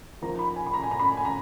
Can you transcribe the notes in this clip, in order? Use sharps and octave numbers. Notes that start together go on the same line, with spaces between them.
F3 A#3 D#4 A#5
A#5
B5
G#5
B5
A#5
G#5
A#5
B5
G#5
A#5